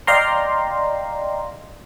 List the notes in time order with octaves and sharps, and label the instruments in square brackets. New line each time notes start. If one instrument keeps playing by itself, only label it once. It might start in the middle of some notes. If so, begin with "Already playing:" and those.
[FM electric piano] D5 D#5 F5 G5 A#5 C6